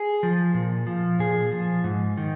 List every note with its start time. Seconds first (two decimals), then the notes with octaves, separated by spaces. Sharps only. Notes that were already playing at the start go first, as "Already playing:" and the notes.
Already playing: G#4
0.23 F3
0.54 A#2
0.87 F3
1.19 A#2 G#4
1.52 F3
1.84 G#2
2.17 D#3